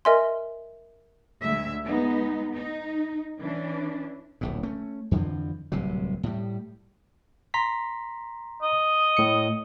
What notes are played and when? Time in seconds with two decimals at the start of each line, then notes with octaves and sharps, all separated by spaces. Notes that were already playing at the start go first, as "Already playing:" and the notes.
0.05 A#4 D#5 E5 G#5 C6
1.41 D2 G#3 E5
1.85 G#3 B3 D#4
2.55 D#4
3.41 E3 C#4 D4
4.41 D1 A#1 G#2
4.63 A3 C#4
5.11 F2 D3 E3 F3
5.72 D1 C2 C3 F#3
6.23 A2 G3
7.54 A#5 C6 B6
8.63 D#5
9.17 A2 C#7